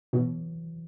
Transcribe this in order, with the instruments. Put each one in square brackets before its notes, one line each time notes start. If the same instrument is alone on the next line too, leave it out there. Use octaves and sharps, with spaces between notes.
[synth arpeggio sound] B2 [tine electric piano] E3 F#3